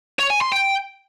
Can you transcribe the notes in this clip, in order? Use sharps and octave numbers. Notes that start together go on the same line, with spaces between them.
C#5
G#5
C6
G5